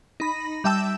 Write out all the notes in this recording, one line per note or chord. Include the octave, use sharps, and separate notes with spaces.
D#4 B5 A#6
G3 E5 G5 A5 E6 E7